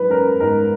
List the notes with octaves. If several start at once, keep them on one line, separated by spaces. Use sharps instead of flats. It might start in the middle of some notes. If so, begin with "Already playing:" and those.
Already playing: G#2 F#3 B4
C#4 A#4
G#2 A#4